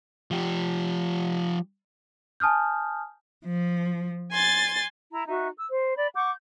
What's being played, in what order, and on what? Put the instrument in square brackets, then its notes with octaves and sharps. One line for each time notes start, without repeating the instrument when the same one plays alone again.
[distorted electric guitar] F3 G4
[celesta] G#5 A5 D#6 F6 G6
[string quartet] F3
G#5 C6 A6
[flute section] E4 A#5
D#4 F#4 E5
E6
C5
D5 B5
F#5 C#6 D6 G6